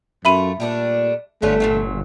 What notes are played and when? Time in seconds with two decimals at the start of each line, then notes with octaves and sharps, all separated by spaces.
0.25 F#2 A3 F4 E5 B5 D#7
0.60 A#2 G3 A3 D4
1.42 G1 D3 A3 C#4 F4
1.60 A#2 C#3 F#3